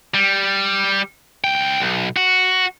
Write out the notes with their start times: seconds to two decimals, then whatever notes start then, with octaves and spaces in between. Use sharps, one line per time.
0.14 G3
1.44 C#2 G5
1.80 B1
2.16 F#4